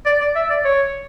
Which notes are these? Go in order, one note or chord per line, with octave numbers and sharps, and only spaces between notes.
D5
D5
E5
D5
C#5